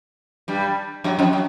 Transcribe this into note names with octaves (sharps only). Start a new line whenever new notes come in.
G2 G3
F#2 F#3
F2 F3
F#3